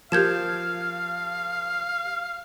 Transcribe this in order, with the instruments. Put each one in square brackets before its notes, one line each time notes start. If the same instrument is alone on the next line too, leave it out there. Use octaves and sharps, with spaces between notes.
[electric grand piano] F3 [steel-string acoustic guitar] G4 A#4 A5 [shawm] F5 [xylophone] G6 G#6 E7